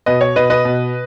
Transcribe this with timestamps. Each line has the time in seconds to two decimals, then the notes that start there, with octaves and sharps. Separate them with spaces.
0.06 B2 B4 D#5
0.21 C#5
0.36 B2 B4 D#5
0.50 B4 D#5
0.65 B2